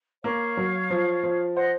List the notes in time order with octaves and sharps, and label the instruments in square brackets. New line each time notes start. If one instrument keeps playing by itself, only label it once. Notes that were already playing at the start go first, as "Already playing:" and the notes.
[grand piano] A#3 [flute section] C#5 F5
[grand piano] F#3
F3
F3
[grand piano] C5 [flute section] D#5 F#5